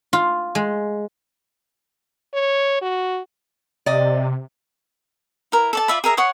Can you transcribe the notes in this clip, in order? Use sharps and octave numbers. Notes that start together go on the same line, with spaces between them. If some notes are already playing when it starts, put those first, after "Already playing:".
F4
G#3
C#5
F#4
C3 D5 D#5
E4 A#4
A4 D5 A5
F4 D5 E5 B5
G#4 A#4 E5 A#5
C#5 F#5 C6 D#6